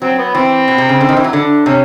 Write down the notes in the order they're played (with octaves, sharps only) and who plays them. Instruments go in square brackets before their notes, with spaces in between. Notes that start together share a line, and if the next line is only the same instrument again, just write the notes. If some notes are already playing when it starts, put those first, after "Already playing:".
[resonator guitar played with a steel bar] F#3 [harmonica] C4
[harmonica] B3
[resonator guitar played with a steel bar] E3 [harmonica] C4
[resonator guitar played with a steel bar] B2
C3
C#3
D3
D#3
E3
F#3
D3
[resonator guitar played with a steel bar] C3 [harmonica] C#4